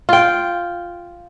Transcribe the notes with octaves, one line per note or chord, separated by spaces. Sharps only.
F4 G5